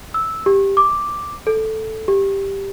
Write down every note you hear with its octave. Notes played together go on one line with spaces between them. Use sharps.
E6
G4
D6
A4
G4